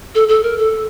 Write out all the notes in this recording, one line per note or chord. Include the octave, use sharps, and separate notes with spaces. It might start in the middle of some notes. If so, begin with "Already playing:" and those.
A4
A4
A#4
A4